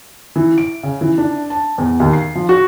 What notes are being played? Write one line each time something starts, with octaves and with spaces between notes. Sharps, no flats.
E3
D7
C#3
E3
D4
A5
E2
D#2
C7
F3
F#4